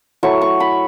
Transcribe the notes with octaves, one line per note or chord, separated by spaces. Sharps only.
F#3 A3 E4 C#6
C#6
B5